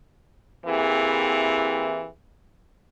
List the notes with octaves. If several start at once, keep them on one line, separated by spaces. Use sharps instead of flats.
E3 A#3 C4 E4 G4 G#4